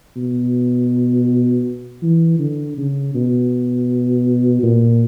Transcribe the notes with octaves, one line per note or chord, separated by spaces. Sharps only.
B2
E3
D3
C#3
B2
A#2